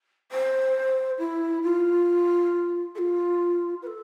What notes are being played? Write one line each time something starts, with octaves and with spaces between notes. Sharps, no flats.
C5
E4
F4
A4
F4
B4
A4